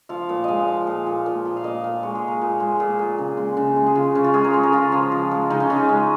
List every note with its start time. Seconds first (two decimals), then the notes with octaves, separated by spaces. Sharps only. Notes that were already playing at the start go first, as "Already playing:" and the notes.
0.09 F3 F5
0.29 A#2
0.44 G#3 D#5 F5
0.68 F3
0.87 A#2
1.07 A#2
1.26 A#2
1.45 A#2
1.57 F5
1.63 A#2 D#5
1.84 A#2
2.03 G#3 C#5
2.15 G#4
2.22 G#3
2.28 A#4
2.41 A#2 G#4
2.60 G#3
2.80 A#2 G#4
2.99 A#2
3.18 C#3
3.37 G#3
3.57 C#3
3.76 G#3
3.86 G#4
3.95 C#3 F4
4.15 C#3 C#4
4.24 F4
4.34 G#3 G#4
4.44 A#4
4.53 G#3 C#5
4.63 A#4
4.72 C#3 F4
4.92 F3
5.12 F3
5.31 G#3
5.50 C#3 D#4
5.60 C#4
5.70 C#3 D#4
5.89 G#3